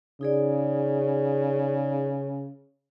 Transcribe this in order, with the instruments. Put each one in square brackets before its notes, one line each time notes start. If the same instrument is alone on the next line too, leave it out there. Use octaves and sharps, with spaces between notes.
[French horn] C#3 [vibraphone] D#4 G#4 D5